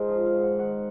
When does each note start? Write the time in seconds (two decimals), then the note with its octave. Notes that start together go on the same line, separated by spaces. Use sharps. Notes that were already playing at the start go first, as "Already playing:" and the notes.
Already playing: G#2 G#3 G#4 A#4 C5
0.08 F3 F5
0.25 F5
0.34 G#2
0.42 F#5
0.59 D#3 F#5